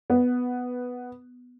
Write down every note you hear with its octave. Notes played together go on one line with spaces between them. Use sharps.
B3